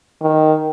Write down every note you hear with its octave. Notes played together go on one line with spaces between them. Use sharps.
D#3